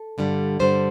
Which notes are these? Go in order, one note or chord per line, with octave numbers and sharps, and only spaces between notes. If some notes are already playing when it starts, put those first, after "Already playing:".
Already playing: A4
G2 D3 G3
G2 D3 G3 C5